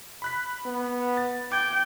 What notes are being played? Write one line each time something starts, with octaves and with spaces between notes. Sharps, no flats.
B5 F#6 B6
B3
A6
G5 D6 G#6